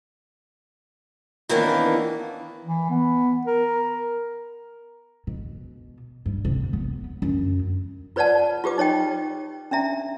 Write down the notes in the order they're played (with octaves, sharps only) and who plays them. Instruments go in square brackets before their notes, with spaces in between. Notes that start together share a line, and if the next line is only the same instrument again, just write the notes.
[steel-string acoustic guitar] D#3 E3 A#3 B3 C#4 D4
[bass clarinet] E3
B3
A#4
[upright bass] B2
G2
C3
B3
F#2
[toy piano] F4 B4 C#5 D5 F#5 A5
F4 G4 B4 D6
D#4 C#5 D#5 G5
C#4 D4 E5 A#5